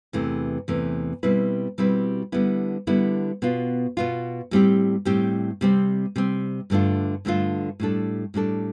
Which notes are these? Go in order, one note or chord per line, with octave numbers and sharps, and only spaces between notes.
E2 C3 E3 A3
E2 C3 E3 A3
B2 G3 C4 E4 B4
B2 G3 C4 E4 B4
D3 G3 B3 E4
D3 G3 B3 E4
B2 B3 F4
B2 B3 F4
A2 G3 C4 G4
A2 G3 C4 G4
C3 G3 C4
C3 G3 C4
G2 D3 A3 D4 F4
G2 D3 A3 D4 F4
A2 G3 D4 A4
A2 G3 D4 A4